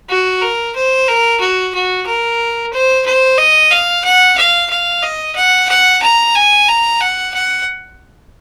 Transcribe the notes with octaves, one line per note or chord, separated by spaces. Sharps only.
F#4
A#4
C5
A#4
F#4
F#4
A#4
C5
C5
D#5
F5
F#5
F5
F5
D#5
F#5
F#5
A#5
G#5
A#5
F#5
F#5